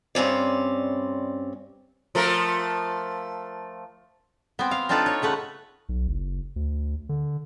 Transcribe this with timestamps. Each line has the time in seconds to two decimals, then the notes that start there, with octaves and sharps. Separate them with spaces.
0.15 G2 C4 C#4 D5
2.15 F3 A3 A#4
4.59 B3 C4
4.71 F5
4.89 C4 D4 D#4 F4 A4 B4
5.06 C#5
5.22 C#3 A3 B4 F#5
5.89 B1
6.07 F#1
6.56 D2
7.09 D3